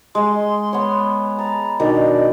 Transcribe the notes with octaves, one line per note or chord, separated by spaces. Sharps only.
G#3 C6
B3 C#5
A5 A#5
B2 D#3 D4 D5